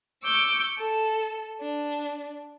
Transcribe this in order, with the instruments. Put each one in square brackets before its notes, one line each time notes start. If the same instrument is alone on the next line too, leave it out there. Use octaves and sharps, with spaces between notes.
[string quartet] C#6 D6 E6 G6
A4
D4